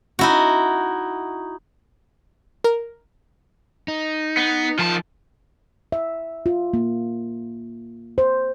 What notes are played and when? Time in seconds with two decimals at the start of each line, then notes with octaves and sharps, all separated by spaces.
0.19 D#4 E4 F#4
2.64 A#4
3.88 D#4
4.37 B3
4.79 D#3 F3 A5
5.92 E5
6.46 F4
6.74 A#3
8.18 C5